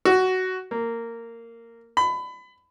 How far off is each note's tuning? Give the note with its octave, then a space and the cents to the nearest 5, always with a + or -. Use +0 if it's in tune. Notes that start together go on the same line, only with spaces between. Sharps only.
F#4 +10
A#3 -15
B5 +25